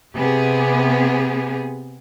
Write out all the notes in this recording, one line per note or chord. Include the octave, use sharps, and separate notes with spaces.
C3 B3 G4 G#4